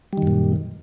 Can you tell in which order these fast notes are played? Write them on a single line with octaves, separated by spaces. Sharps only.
G3 D#3 F#2 A#2